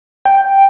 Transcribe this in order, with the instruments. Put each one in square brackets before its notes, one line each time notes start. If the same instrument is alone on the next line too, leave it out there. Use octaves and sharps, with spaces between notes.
[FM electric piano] G5